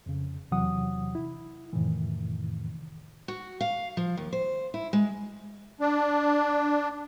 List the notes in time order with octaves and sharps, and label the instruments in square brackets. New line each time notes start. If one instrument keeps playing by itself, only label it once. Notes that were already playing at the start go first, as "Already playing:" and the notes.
[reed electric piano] F2 C#3
E2 C3 E3 F#3 F#5 D#6
E4
F2 A2 C3 D#3 E3
[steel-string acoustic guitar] F#4
F5
F3
D#2
C5
E4
G#3
[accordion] D4